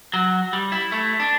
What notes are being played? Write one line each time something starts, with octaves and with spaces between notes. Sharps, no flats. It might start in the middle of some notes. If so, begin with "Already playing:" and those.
F#3
G3
E4
A3
D4